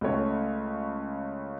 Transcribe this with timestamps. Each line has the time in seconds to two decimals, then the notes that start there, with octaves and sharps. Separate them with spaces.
0.01 C#2 A3 C#5